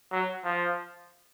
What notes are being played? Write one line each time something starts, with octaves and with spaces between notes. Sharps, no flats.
F#3
F3